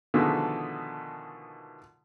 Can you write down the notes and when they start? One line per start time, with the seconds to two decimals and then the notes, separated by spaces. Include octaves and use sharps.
0.14 B2 D3 D#3 F3 G#3 A3